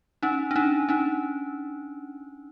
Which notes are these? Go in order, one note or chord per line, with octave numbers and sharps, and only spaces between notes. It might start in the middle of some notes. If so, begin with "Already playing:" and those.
C#4 D#4
D4
C#4 D#4
C#4 D#4